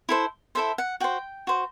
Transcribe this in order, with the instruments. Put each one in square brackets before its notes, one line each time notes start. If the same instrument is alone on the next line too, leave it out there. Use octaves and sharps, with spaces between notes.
[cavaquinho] E4 A4 C5
E4 A4 C5 E5
F#5
F#4 C5 G5
F#4 C5